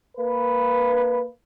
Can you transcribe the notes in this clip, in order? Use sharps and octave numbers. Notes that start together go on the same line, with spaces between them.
A#3 B4